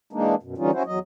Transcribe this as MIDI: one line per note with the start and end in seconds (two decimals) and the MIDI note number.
0.13 0.35 52
0.13 0.35 56
0.13 0.35 58
0.13 0.35 62
0.13 0.35 63
0.43 0.55 42
0.43 0.55 47
0.58 0.71 50
0.58 0.71 52
0.58 0.71 55
0.58 0.71 61
0.58 0.71 63
0.58 0.71 65
0.73 0.83 61
0.73 0.83 64
0.73 0.83 66
0.73 0.83 72
0.86 0.99 40
0.86 0.99 54
0.86 0.99 75